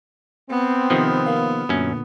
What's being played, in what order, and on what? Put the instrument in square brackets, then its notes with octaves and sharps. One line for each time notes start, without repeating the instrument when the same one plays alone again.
[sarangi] B3 [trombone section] C4
[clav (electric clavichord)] C3 D#3 F3
[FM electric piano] A#3 F5
[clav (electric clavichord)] F#2 C#4 [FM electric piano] A#2 D3